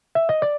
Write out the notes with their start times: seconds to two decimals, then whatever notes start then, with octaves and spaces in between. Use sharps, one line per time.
0.15 E5
0.29 D#5
0.42 D5